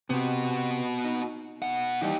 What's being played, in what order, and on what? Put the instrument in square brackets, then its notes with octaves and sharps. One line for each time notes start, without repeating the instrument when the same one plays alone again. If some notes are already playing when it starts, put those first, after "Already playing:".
[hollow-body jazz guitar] C3 [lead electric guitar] B3 F#4
[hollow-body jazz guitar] D#4
[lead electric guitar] B2 F#5
[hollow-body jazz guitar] E3 G3 [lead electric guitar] D#4 G4